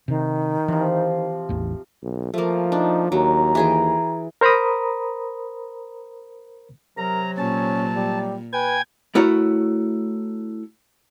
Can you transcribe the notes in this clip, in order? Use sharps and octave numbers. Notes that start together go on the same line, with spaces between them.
C3 D#3
C3 E3 F3
A1 E2
B1
F3 A3 A#3
D4 D#4
D#2 F#3 A#5
E3 G#4 G5
A#4 C5 A#5 B5 D#6
C3 F#3 A#4 A#5
A#2 C#4 A5
G3
B4 G5 G#5 G#6
A3 E4 F#4 A#4 C#5